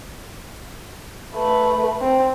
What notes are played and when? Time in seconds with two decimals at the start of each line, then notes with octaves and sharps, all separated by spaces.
1.35 A3 B4
2.01 C4